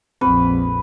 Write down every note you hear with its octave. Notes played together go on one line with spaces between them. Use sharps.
A#1 F2 C4 B4